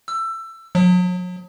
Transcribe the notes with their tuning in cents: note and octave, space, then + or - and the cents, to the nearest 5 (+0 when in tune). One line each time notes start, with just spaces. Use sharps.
E6 +20
F#3 -40